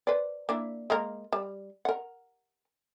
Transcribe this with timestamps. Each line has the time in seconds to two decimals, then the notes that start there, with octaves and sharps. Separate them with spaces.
0.07 B4 C5 D5
0.49 A#3 D4 E4
0.90 G#3 A#3 A#4
1.33 G3
1.85 A#4 F#5